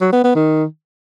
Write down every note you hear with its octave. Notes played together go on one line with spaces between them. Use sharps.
F#3
B3
B3
D#3